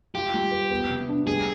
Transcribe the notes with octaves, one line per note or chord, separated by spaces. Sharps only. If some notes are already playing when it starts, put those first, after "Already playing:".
F4 G4
G3
B4
B3
C3
D4
G3 G#4